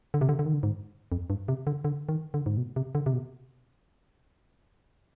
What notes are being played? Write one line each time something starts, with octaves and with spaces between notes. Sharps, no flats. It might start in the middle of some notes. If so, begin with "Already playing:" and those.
D3
C3
D3
D3
D#3
D3
G#2
F2
G2
C3
D3
D3
D#3
D3
G#2
B2
C3
D3
C3
B2